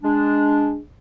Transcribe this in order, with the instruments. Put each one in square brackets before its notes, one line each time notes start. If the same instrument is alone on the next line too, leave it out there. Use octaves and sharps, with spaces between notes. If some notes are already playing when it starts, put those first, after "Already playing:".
[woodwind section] G#3 D4